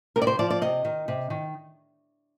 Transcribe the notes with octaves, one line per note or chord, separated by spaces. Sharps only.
C3 A#4
D5
C5
F3 D5
D5
C3 D#5
D#3
C3
D#3